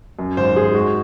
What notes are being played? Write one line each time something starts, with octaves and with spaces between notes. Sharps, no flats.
F#2
G#1 C5
G#1 G#4
G#3 F#4